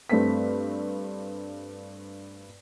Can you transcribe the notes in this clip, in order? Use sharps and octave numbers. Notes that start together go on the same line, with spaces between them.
G2 A3 C4 B6